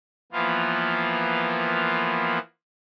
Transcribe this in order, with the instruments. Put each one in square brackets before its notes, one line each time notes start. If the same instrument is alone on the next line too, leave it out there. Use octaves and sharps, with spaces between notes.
[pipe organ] E3 F3 A#3 B3 F4